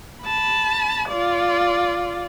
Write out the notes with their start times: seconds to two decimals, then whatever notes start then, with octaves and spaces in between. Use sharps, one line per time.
0.24 A5 B5
1.08 F4 D5